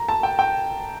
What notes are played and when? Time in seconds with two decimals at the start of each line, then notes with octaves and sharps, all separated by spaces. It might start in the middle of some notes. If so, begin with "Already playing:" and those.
Already playing: A#5
0.09 A5
0.23 G5
0.39 G5